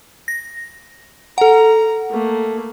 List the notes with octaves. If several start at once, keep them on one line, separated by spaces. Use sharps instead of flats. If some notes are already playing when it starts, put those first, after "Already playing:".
A#6
A4 F#5 A#5
A3 A#3